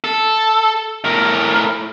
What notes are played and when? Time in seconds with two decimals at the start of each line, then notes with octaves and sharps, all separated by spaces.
0.04 A4
1.05 A2 A#4